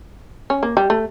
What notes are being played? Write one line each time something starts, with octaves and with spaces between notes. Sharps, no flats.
C#4
A#3
G3
A3